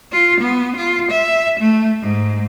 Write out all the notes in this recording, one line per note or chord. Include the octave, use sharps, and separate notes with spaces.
F4
B3
F4
E5
A3
G#2